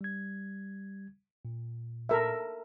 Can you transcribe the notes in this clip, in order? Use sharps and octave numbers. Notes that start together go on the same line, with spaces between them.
G3 G#6
A#2
A4 A#4 E5